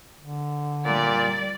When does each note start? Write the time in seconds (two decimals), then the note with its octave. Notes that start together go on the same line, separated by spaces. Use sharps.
0.21 D3
0.85 A#2 G3 D5